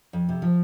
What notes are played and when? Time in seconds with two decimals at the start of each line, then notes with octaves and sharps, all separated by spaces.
0.13 F2
0.29 C3
0.42 F3